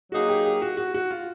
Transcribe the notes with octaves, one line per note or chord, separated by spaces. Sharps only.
F#3 A#3 D#4 F#4 G#4
G4
G4
F#4
F#4
F#4
F4